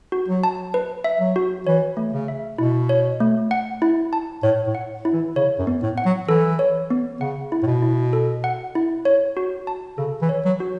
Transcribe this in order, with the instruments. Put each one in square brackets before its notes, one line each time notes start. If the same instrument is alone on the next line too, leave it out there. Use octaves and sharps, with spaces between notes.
[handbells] F#4
[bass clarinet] F#3
[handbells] A5
B4
E5
[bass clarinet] F#3
[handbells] F#4
[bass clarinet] E3 [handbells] C#5
[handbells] A3
[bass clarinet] C#3
[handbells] E5
[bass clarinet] B2 [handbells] E4
[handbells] C#5
A3
F#5
E4
A5
[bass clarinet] A2 [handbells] C#5
[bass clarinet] A2
[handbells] F#5
E4
[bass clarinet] E3
[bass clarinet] C#3 [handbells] C#5
[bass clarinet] F#2
[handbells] B3
[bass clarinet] A2
[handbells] F#5
[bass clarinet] F#3
[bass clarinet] E3 [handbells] A4
[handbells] C#5
B3
[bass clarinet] C#3 [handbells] F#5
[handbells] E4
[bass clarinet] A2
B2
[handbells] E4
A4
F#5
E4
C#5
F#4
A5
[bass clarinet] C#3 [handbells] A4
[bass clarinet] E3
[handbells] C#5
[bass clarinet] F#3
[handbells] F#4